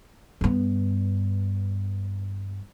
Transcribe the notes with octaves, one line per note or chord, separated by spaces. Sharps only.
G2 B3